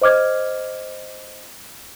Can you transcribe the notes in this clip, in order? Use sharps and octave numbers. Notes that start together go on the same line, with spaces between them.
C5 D#5 D6 F6 G#6